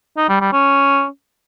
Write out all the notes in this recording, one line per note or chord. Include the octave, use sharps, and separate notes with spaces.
D#4
G3
G3
C#4